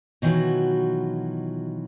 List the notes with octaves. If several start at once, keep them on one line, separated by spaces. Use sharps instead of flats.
B2 D#3 E3 F#3 F4 F#4